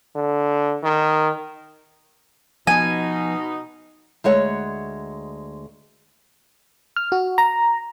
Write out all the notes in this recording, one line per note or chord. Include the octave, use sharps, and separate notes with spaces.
D3
D#3
B2 F3 B3 D#4 G#5
D2 G#3 C#5 F#5
F6
F#4
A#5